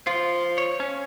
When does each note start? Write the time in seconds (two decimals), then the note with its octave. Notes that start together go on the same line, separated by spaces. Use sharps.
0.07 F3 F4
0.58 C#5
0.80 C#4